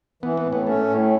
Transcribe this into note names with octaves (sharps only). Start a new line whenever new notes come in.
E3 B3
B3
A2
B3
A3 C#4
A2